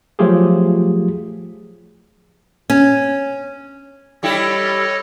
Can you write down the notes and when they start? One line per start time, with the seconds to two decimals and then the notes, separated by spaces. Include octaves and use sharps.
0.19 F3 F#3 A3 F4 G4 G#4
2.70 C#4
4.23 G3 E4 G4 A4 C#5 D#5